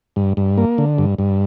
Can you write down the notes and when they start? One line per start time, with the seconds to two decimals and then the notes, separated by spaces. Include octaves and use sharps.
0.16 G2
0.37 G2
0.58 A#3
0.78 D3
0.98 G2
1.19 G2